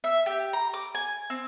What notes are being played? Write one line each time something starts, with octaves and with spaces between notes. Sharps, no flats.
E5
G4
A#5
D6
G#5
C4